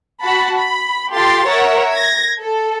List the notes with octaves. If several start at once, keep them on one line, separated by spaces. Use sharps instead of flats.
F#4 A5 B5
B5
F4 G4 A4 C6 A6
A#4 C#5 E5 F#5
G#6 A#6
A4